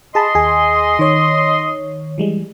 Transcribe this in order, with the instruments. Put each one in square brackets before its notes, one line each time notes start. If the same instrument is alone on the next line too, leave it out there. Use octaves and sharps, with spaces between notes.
[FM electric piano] G#4 A5 B5 [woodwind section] D#5 C6
[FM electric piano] D#2 G#4 G#5
D#3 C#5
E3 G3 G#3